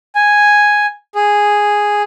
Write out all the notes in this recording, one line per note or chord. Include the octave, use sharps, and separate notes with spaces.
G#5
G#4